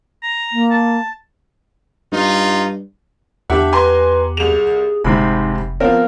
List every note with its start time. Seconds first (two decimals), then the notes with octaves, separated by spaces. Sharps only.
0.23 A#5
0.52 A#3
0.71 A5
2.12 G2 D#4 F4
3.50 E2 D4 G4 E5 F#5
3.73 B4 G#5 A#5 C6
4.37 C2 G#4 F7
5.04 F1 G#2 C3 C4 D#4 B5
5.80 F3 B3 C4 A#4 F5